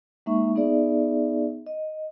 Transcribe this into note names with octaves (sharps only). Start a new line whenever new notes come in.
G#3 A#3 D#4 E5 C#6
B3 D#4 G#4 D5 E5
D#5